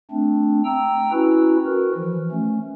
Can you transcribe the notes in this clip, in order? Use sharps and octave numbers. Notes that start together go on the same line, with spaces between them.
A3 C4 D4
G5 A#5 E6
C#4 E4 F#4 B4
F#4 A#4 B4
E3 F3
A3 C#4